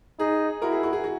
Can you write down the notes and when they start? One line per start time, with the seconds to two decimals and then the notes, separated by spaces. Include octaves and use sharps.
0.19 D#4 G#4
0.62 E4 F#4 A#4
0.72 G#4
0.83 F#4
0.93 G#4
1.04 F#4